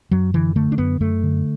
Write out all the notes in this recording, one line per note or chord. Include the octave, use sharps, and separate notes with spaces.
F#2 F#3
D3 E3
D3 A3
D4
F#2 B3
F#2 A3
D3